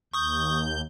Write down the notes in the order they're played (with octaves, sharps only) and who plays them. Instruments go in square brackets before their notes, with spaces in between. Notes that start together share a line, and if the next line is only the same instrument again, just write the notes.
[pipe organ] D#2 G6 [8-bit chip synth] C#6 D#6